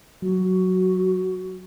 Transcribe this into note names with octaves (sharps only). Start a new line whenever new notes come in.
F#3 F#4